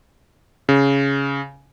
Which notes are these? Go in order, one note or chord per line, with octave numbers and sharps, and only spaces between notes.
C#3